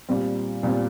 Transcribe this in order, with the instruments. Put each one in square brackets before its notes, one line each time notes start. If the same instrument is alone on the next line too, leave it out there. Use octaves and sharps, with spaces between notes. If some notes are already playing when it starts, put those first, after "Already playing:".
[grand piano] A#2 G3 C4
A#2 G3 C4